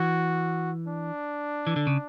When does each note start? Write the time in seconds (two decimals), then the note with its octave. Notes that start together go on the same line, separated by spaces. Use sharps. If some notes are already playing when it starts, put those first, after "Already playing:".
Already playing: E3 F#4
0.87 D4
1.67 E3
1.76 D3
1.87 C#3